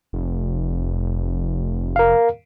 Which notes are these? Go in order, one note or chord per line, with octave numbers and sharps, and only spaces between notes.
F1
A#4 F5